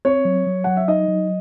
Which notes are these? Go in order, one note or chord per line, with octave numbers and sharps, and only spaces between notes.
C4 C#5
F#3
F#3
F#3 F#5
E5
D#4 D#5
F#3